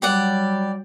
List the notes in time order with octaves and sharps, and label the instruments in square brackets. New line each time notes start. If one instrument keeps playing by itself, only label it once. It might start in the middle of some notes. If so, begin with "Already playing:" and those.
[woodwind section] F#3 G3 [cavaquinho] G4 D5 F#5